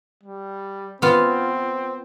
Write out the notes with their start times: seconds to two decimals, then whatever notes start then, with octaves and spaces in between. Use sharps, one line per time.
0.24 G3
1.02 B3 C4 F4